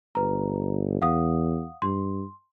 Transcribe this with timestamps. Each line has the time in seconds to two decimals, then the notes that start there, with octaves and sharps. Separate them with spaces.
0.15 G1 B4 A#5
1.02 E2 F5 F#5 D#6
1.82 G2 C6